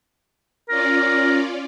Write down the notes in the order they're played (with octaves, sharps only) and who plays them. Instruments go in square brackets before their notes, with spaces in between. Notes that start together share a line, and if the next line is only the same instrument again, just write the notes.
[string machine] C#4 F4 D5 [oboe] A#4